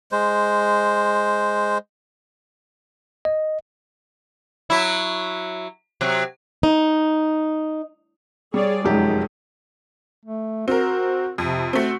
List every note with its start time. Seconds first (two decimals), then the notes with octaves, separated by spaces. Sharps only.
0.12 G#3 C5
3.25 D#5
4.70 F#3 E4
6.01 C3 F#3
6.63 D#4
8.54 G3 G#4 C#5 D5
8.85 F1 F#2 D#3 G#3 G4
10.26 A3
10.68 C4 F#4 A#4
11.38 F2 C3
11.73 A3 C4 F#4